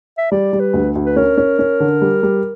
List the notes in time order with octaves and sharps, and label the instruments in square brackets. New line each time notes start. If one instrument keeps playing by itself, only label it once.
[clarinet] E5
[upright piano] G3 [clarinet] D5
[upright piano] G3
[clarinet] B4
[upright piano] D2
D2
[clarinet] B4
[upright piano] C#4 [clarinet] A#4
[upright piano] C#4
C#4
D3
G3
G3